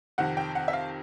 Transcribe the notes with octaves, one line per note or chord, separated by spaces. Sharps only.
F2 C3 D#3 F#5
G5
F#5
E5
F5